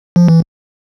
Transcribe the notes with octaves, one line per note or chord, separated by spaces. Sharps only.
F3
E3